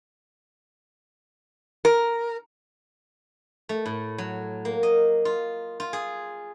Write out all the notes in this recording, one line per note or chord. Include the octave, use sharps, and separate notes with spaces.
A#4
A3
A2
F#3
A#3
D#5
F4
F4
G#4